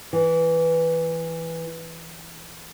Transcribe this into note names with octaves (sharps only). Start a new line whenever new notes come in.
E3